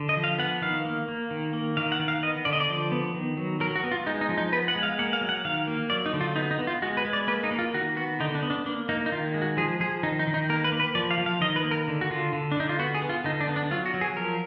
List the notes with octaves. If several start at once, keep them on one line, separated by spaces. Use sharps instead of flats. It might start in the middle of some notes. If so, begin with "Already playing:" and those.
Already playing: D3
D#5
F3
F5
B3 F#5
D#3 F5
A#3
A#3
D#3
A#3
D#3 F5
F#5
D#3
F5
B3 D#5
D3 D5
D#5
D5
F3
B3
D#3
F#3
F#3 A#4
F#4
B3
F4
G#3 D#4
D#4
F3
D#4
B3 B4
F#5
G#3
F5
A#3 F#5
F5
F#3
F#5
D#3 F5
A#3
F#3 D5
D#4
D3
F4
B3 D#4
D#4
B3
F4
G#3 F#4
B4
G#3
D5
A#3 B4
D#4
A#3
F4
D#3 F#4
B3 F#4
D3 D#4
D4
B3
D4
A#3 D4
A#3 D#4
D#4
D#3 F4
G#3
F#4
F3 G#4
F3 G#4
D#3 D#4
D#4
D#3
D#4
A#3 A#4
B4
A#3
B4
F3 D5
F5
F3
F5
D#3 D#5
B4
A#3
A#4
D3
F#4
D3 F4
D3
D4
D3 D#4
F4
B3 F#4
G#4
B3
F4
D3 D#4
D4
B3
D4
F#3 F4
F#4
F#3
G#4
F3 A#4